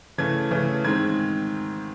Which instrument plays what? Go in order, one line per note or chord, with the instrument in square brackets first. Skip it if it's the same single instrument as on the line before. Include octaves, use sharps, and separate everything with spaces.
[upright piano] C#3 E3 A3 G#6
C#3 E3 A3
G#2 D#3 G#3 C4 G#6